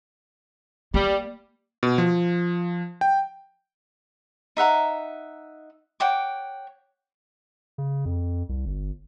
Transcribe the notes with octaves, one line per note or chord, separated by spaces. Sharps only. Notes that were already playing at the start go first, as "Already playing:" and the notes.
G3 A#3
B2
F3
G5
D#4 E5 F#5 A#5
C#5 F#5 G5 D6
C#3
F2
C2
G1